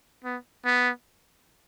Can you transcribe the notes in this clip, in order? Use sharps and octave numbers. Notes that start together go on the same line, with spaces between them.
B3
B3